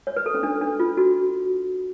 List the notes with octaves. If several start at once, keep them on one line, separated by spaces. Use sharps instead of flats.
C#5
B4
A4
C#4
D4
D4
F4
F#4